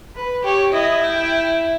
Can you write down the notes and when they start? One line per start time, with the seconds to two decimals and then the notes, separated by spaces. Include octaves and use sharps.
0.16 B4
0.44 G4 C#5
0.73 E4 D#5
1.03 G5